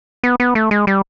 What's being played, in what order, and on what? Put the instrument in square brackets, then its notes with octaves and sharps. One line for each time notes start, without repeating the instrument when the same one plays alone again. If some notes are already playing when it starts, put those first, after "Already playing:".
[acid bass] B3
B3
A3
G#3
G3